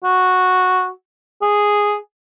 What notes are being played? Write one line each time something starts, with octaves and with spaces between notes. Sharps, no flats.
F#4
G#4